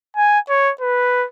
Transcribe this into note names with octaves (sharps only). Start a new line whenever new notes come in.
G#5
C#5
B4